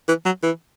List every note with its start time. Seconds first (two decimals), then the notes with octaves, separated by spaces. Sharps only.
0.08 E3
0.25 F#3
0.43 E3